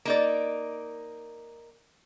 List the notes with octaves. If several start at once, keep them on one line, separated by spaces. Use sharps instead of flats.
A#3 D#4 D5